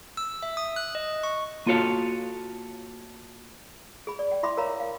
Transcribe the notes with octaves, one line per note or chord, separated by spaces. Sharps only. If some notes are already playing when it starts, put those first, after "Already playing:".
E6
E5
D#6
F#6
D#5
C#6
A#3 F4 F#4 A4 C#5 F5
G#4 B5
D5
G5
E4 E5 B5 C6 D6
A#4 C#5 F5 A#5 B5
F5